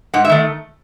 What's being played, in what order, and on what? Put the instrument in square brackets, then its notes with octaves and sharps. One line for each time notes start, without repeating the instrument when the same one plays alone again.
[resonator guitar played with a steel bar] G#2 F#5
E5
D#3 A3